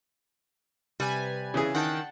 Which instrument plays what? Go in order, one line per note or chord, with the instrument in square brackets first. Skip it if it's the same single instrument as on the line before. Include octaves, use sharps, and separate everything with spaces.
[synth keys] C3 B4 G#5 [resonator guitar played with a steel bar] G3
[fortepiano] C#3 E3 G#4
[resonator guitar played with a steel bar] D#3 [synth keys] F#5 G5 A5